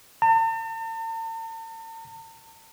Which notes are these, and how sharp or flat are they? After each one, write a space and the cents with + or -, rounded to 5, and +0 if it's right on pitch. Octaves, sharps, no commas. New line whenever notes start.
A5 +45